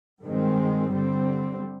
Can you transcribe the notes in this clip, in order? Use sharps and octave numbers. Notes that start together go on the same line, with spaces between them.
G2 D#3 G#3 C4
D3 G3 C4